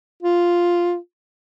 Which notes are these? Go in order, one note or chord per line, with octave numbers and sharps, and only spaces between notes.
F4